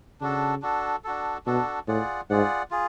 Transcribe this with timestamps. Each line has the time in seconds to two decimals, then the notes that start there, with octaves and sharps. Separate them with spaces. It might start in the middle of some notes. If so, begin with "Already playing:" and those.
0.21 C#3 D4 F#4 A4
0.62 D4 F#4 A4
1.04 D4 F#4 A4
1.46 B2 D4 F#4 A4
1.87 A2 F4 G#4 D5 F#5
2.30 G#2 F4 G#4 D5 F#5
2.70 F4 G#4